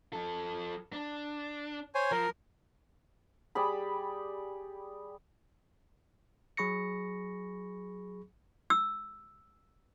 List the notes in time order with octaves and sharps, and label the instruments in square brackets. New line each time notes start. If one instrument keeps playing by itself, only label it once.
[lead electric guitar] F3 A4
D4
[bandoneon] C5 C#5 G#5
[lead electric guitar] F3 [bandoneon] A#4
[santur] G3 G4 G#4 B5
[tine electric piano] F#3 G#4 B5 C#6 A#6 C#7
[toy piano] E6